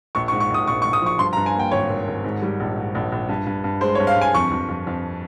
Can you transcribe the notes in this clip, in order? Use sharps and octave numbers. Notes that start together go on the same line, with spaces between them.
A#1 C#6
C#6
G#2
C#6
A#1 D#6
A#1 C#6
A#1 C#6
D#6
F3 C#6
G2 C6
A#5
G2
G#5
A#3 G5
G#1 C#5
G#1
G#1
G#2
G3
A#1
G#2
A#1
A#1
G2
G2
G2
G#3 C5
C#5
G2
F5
G2 G#5
F2 C#6
F2
F2
F2